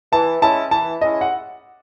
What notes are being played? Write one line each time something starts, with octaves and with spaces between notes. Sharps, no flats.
E3 A5
G#3 C#4 E4 A5
E3 A5
G#3 C#4 E4 D#5
F#5